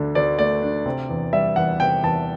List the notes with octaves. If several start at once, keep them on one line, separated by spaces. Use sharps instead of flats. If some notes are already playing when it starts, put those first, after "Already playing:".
Already playing: D2 D3 A3 D4
D2 D5
A3 D5
D4
C3
E2
G3 E5
E2 F#5
C3 G5
E2 A5